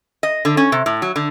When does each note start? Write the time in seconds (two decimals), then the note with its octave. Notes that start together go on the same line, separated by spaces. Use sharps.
0.23 D#5
0.45 D3
0.57 C#4
0.72 C3
0.86 A2
1.02 F#3
1.16 D3